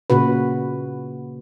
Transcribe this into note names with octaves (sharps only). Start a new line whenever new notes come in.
A#2 C#3 F#4 B4